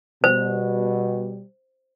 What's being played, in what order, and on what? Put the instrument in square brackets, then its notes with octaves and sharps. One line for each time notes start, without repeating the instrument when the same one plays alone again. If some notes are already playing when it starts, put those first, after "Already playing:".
[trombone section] B2 G3 [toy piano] C5